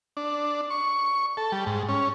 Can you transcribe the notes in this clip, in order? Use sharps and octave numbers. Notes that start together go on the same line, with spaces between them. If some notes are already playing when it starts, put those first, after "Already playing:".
D4
C#6
A4
G3
G#2
C#4